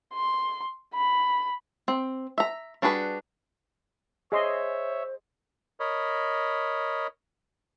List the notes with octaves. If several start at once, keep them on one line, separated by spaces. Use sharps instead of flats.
C6
B5
C4
E5 A#5
G3 D4 F#4 G#4 B4
G#4 C5 C#5 D#5 E5 C6
A#4 C#5 D#5 B5